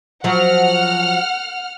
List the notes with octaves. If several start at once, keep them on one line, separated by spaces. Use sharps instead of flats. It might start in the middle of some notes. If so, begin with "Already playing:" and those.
F3 F#3 F#5 F6